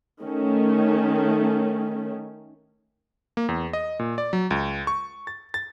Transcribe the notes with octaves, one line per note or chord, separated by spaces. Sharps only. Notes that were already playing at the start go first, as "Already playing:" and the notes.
D#3 A3 C#4
A#3
E2
D#5
A#2
D5
F#3
C#2
C#6
A6
A6